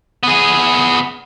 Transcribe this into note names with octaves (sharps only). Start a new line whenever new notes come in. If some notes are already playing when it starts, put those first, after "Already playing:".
B3 G#4